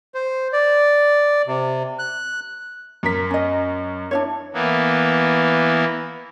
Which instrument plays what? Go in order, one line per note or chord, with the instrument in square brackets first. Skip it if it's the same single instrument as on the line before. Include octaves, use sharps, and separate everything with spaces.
[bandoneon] C5
D5
C3
F#6
[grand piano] F#2 A#4 B6
[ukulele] C#4 D#5
D4 E4 C#5
[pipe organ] E3 A#3 B3